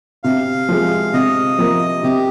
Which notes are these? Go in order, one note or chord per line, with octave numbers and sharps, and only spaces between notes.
C3 F5
F3 G#3
C3 D#5
F3 A#3
C3 G4